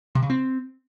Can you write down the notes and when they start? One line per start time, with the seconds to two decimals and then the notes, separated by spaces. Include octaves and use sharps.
0.15 C3
0.23 C#3
0.30 C4